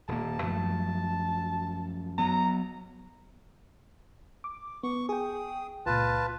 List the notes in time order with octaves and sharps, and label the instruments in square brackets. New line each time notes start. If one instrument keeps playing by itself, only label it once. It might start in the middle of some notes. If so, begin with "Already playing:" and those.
[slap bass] D#1 A#3 [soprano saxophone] A5
[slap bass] F#2 F3 A3
[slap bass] F#3 B3 [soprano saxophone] A#5
[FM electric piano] D6
[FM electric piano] B3 [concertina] C#6
[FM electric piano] G#4 G5 [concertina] D#6
[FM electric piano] C#2 A#2 [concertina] F4 B4 A5